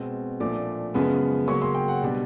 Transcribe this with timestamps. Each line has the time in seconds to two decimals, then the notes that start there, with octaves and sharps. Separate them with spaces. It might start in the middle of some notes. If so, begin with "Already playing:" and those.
Already playing: B2 G#3 C4
0.40 A#2 F3 A3 D4 D6
0.94 F#2 C#3 F3 G#3 B3
1.48 C#3 F#3 A#3 C#4 C#6
1.62 C6
1.75 G5
1.88 F#5
2.02 B2 G3 B3 D4